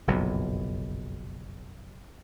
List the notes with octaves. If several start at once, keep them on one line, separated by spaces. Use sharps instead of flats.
F#1 B1 F2 A#2